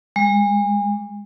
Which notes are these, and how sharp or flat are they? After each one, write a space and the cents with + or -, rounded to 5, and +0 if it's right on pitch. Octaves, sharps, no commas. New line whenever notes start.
G#3 -35